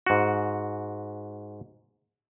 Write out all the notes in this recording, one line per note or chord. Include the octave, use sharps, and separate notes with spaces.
G#2 F#4